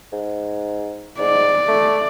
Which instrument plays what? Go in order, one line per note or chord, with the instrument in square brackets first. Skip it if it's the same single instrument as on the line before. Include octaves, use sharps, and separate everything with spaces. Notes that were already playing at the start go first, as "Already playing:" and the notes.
[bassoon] G#2
[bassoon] G#2 [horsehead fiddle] D5
[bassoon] A3